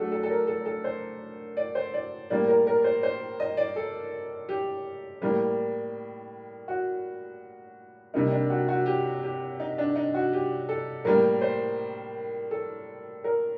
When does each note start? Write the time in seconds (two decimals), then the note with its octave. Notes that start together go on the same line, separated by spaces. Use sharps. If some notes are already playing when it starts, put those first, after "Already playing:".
Already playing: F#3 A3 D4 F#4 A4
0.12 A4
0.23 A4
0.30 A#4
0.47 A4
0.65 A4
0.84 C5
1.57 D5
1.75 C5
1.94 D5
2.30 A2 G3 A#3 D5
2.48 A#4
2.67 A#4
2.84 C5
3.03 C5
3.40 D#5
3.57 D5
3.76 A4
4.49 G4
5.22 A2 G3 A#3
6.68 F#4
8.14 C3 G3 A#3 D#4
8.32 D4
8.50 F#4
8.68 F#4
8.86 G4
9.23 G4
9.60 D#4
9.78 D4
9.96 D#4
10.14 F#4
10.33 G4
10.69 A4
11.05 A2 G3 A#3 A#4
11.41 C5
12.51 A4
13.24 A#4